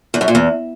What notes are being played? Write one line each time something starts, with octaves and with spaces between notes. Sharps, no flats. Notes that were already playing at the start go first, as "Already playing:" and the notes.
E2
F#2
A#2
E2